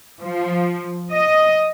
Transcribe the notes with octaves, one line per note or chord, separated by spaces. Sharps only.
F3
D#5